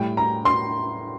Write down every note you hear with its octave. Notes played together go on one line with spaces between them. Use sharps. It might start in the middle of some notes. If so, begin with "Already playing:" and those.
Already playing: A2 G3 G5
A#5
C6